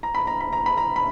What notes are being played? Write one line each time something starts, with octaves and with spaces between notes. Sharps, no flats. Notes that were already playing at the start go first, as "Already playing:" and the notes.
A#5
B5
A#5
B5
A#5
B5
A#5
B5